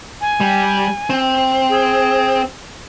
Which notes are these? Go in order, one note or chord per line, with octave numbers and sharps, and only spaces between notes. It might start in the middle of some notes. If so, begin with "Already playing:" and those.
G#5
G3
C4
G#4